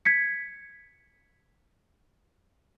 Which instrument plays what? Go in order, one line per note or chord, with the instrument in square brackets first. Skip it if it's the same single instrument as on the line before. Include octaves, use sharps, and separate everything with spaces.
[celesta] G#6 B6 C#7